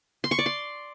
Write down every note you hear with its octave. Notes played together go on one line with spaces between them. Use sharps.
C6
C#6
D5
C6